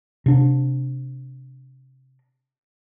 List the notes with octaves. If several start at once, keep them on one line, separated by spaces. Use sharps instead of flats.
C3 D4